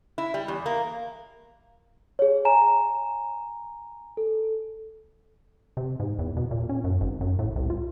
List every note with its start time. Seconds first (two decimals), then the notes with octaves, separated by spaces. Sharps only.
0.18 E4
0.34 G3
0.48 E2
0.66 A#3
2.19 G#4 C#5
2.45 G#5 A#5 E7
4.17 A4
5.77 C3
6.00 G#2
6.19 E2
6.37 B2
6.51 A#2
6.69 C#4
6.84 F#2
7.01 G#1
7.21 F#2
7.39 A2
7.56 C2
7.70 F4